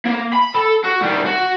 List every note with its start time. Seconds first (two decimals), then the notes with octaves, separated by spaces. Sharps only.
0.05 A#3
0.33 B5
0.55 A4
0.84 F#4
1.02 D#3 G3
1.26 F#4